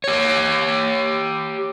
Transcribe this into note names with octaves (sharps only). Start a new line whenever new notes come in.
G4 C#5